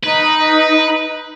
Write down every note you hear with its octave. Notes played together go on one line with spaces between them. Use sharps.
D#4 B4